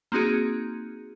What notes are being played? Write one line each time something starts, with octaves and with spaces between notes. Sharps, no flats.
A#3 C4 D#4 F#4 G#4